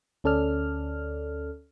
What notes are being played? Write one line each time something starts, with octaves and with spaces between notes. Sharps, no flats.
D2 C#4 A4 D5 F6